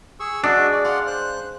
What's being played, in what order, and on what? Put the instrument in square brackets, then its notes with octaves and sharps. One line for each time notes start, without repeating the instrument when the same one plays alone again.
[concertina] G#4 C#6 E6
[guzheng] G#3 [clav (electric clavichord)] D4 [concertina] F#4 D#5 E5
[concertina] D5
[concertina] D5 F#5 C6 [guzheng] F5
[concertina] C5 F#6